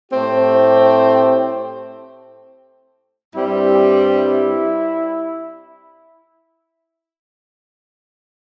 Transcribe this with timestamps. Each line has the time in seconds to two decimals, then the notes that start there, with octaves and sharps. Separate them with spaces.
0.12 A2 A3 C4 G4
3.33 G2 G3 C4 E4
3.73 G4
4.14 E4